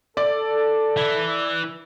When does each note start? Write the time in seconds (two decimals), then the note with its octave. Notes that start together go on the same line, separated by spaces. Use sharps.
0.17 A4 D5
0.97 E3